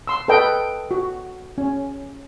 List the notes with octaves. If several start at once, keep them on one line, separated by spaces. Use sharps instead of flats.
C6 E6
A4 B4 D#5 G5
F#4
C#4